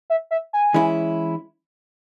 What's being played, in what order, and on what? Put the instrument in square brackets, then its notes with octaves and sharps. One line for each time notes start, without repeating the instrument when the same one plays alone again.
[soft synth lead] E5
E5
G#5
[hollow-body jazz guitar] E3 G#3 C#4 E4